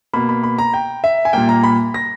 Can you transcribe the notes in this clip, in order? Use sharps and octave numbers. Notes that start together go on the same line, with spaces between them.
B2 A#3 B5
B5
B5
A#5
G5
E5
G#5
A#2 G3 A#3 G5
A#5
B5
A#6